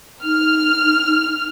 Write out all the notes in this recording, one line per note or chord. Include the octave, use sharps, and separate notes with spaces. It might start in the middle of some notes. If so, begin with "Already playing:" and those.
D#4 F6